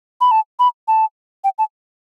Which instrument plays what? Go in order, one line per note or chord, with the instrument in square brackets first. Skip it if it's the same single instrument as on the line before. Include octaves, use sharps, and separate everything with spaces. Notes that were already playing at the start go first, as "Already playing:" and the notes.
[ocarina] B5
A5
B5
A5
G5
A5